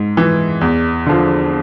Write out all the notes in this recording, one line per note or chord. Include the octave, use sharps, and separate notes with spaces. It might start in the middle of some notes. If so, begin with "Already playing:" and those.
Already playing: G#2
E3
E2
D3 F3